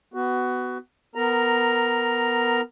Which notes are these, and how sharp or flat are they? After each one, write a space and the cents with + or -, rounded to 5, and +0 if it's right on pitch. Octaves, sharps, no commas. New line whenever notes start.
B3 +15 F#4 +15
B3 +0 A#4 -10 A#5 +0